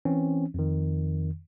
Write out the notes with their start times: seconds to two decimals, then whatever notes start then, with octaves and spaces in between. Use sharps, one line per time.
0.05 E3 C4 C#4
0.54 F2 D#3